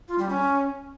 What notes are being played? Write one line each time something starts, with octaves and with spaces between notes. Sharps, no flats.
F4
G3
C#4